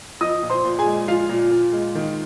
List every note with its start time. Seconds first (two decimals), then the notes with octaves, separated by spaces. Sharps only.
0.21 F3 D#5 D#6
0.43 A#2
0.50 C5 C6
0.65 A#2
0.79 G#4 G#5
0.86 G#3
1.08 F3 F4 F5
1.29 A#2
1.51 A#2
1.73 G#3
1.95 D#3